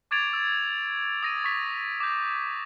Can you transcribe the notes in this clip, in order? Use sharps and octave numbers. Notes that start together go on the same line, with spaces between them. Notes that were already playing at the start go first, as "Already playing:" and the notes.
C#6 D6 G#6 A6 D7 F7
E6
D#6 A#6 D#7
C#6 B6
D6 G6